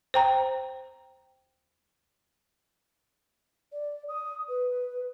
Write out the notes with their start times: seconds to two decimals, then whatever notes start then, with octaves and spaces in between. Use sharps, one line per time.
0.14 C5 G5 A#5
3.73 D5
4.09 D#6
4.48 B4